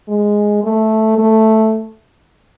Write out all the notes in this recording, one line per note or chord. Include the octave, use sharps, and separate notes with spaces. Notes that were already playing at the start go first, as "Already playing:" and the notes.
G#3
A3
A3